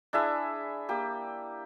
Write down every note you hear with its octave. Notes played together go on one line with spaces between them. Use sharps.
D4 E4 G#4 E5
A#3 G4